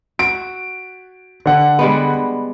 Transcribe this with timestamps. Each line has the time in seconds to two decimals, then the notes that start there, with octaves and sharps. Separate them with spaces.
0.19 F#4 D7
1.46 D3 F#5
1.79 G3 G#3 B3